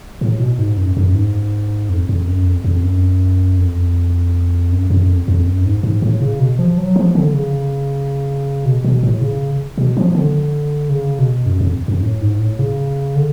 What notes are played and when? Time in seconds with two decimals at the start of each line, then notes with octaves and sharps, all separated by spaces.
0.21 A2
0.39 B2
0.59 G#2
0.77 F#2
0.97 F#2
1.15 G#2
1.89 F2
2.09 F2
2.28 F#2
2.46 F2
2.64 F2
2.83 F#2
3.58 F2
4.72 F#2
4.90 F#2
5.09 F2
5.28 F2
5.46 F#2
5.65 G#2
5.83 G#2
6.02 A2
6.21 C#3
6.40 B2
6.59 F3
6.78 F#3
6.96 F3
7.15 D3
7.34 C#3
8.65 B2
8.84 B2
9.03 A2
9.21 C#3
9.78 B2
9.97 F3
10.15 D3
10.90 C#3
11.19 B2
11.46 F#2
11.61 F2
11.88 F#2
12.03 A2
12.21 G#2
12.40 A2
12.59 C#3
13.16 D3